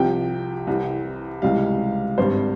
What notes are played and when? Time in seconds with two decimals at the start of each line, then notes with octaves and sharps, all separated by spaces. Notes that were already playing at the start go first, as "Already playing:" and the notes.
Already playing: C2 C3 F3 G5
0.67 C2 C3 E3
1.42 C#2 C3 E3 G3 F5
2.18 G#1 G2 G3 C5